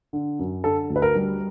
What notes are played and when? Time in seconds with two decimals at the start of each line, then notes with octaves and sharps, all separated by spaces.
0.13 D3
0.39 F#2
0.64 D3 A4
0.90 D2
0.96 B4
1.02 A#4
1.15 G3